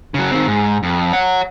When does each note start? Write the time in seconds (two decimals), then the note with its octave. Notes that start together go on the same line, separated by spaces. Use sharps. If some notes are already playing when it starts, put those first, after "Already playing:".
0.14 C#3 F#3
0.31 D#3 C4
0.47 G#2
0.83 F2
1.13 C#5 F#5